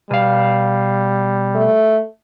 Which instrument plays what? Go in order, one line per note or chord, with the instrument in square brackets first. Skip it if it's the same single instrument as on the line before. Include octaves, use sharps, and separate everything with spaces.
[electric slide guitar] B2 F5 [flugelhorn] G3
[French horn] A3